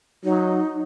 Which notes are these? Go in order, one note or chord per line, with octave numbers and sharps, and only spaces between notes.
F#3 D#4